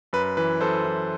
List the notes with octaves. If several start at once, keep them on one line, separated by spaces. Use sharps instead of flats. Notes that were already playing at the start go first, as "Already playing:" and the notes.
F#2 B4
E3 B4
F#2 A4 C5
E3